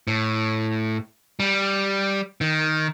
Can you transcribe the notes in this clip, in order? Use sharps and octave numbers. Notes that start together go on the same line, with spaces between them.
A2
G3
D#3